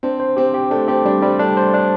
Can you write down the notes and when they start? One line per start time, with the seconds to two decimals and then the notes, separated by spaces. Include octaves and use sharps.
0.03 C4 D4
0.20 C5
0.37 C4 G4
0.54 G4
0.71 A3 D4
0.88 C4 G4
1.05 G3 D4
1.22 G3 C4
1.39 A3 D4
1.57 C5
1.74 D4